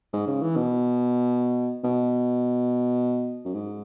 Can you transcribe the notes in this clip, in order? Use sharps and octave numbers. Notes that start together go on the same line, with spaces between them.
G#2
C#3
E3
B2
B2
F#2
G#2